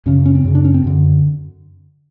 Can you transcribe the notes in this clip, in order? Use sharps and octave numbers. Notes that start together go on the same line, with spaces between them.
F#2 C#3 C#4
C#4
C4
F#2 C#3
D4
C#4
C4
F#2 D3